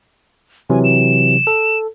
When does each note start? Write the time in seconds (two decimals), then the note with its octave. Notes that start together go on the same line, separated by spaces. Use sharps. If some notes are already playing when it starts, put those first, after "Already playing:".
0.70 C3 E3 F#3 G#5
0.84 E7
1.47 A4